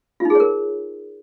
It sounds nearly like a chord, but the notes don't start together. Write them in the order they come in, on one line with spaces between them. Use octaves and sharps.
F4 D#4 G#4 C#5 A#4